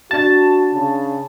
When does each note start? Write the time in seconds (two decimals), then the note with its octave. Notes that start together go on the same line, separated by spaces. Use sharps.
0.11 D4 F#4 A5 A6
0.73 C#3